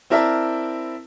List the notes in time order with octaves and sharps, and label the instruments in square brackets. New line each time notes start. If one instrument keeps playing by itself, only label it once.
[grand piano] C4 E4 A#4 D5 E5 A5